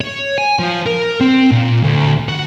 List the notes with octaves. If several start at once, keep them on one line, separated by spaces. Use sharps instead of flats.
C#5
G#5
F3
A#4
C4
A#2
D2
F#4